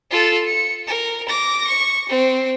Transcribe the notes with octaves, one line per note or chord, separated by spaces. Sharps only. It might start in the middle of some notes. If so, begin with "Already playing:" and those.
F4 A4
C#7
A#4
D6 A#6
C#6
C4